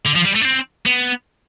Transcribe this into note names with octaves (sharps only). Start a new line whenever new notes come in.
D3
F3
G3
A3
D4
C4
B3